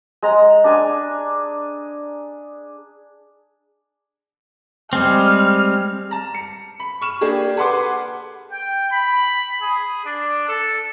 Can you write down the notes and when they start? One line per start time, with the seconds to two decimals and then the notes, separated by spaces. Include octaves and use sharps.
0.23 G#3 A#5
0.64 D4 G#4 G#5
4.93 G3 G#3 C4 F6
6.11 A5 A#5
6.35 C#7
6.80 B5
7.01 C#6 F6 E7
7.21 A#3 D4 G4 G#4
7.57 G#4 A4 B4 F#5 C6 D6
8.52 G5
8.92 B5
9.62 G#4
10.05 D4
10.48 A4